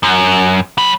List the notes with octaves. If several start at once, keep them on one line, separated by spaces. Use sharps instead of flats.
F#2
F#3 B5